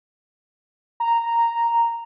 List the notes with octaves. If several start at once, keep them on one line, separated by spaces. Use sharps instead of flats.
A#5